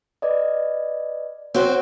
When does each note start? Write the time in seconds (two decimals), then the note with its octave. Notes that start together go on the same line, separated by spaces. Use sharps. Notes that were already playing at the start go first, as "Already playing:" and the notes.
0.22 B4 D5 D#5
1.54 C4 F#4 C5 C#5